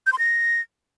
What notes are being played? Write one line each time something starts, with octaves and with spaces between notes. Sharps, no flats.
G6
C6
A#6